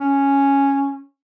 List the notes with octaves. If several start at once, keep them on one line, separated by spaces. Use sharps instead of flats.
C#4